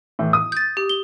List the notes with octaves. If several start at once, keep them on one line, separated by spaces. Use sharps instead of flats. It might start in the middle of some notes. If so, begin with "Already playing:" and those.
A2 E3
D#6
G6 A6
G4
G7